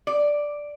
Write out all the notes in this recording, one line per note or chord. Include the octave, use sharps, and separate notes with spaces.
D5